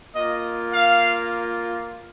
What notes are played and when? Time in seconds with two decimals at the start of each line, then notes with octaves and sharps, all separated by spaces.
0.14 A#3 F4 D#5
0.71 F5